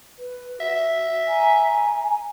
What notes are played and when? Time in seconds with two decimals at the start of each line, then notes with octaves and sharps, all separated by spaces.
0.18 B4
0.61 F#4 E5
1.28 G#5 A#5